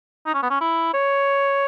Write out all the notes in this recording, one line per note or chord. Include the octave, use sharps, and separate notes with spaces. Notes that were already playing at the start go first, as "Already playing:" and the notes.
D#4
C#4
B3
C#4
E4
C#5